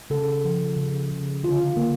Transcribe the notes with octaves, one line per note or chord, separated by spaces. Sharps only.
C#3 A4
F3
C#3
C#3
D3 F4
A#3